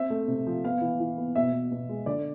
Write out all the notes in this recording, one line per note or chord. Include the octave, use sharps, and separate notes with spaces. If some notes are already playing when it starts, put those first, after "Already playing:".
Already playing: C4 E5
A3
C3
F3
B3 F5
E3
E3
B3
B2 E5
B3
B2
G#3
D3 D5